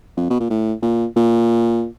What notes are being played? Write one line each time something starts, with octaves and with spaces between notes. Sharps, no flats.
F2
B2
A#2
A2
A#2
A#2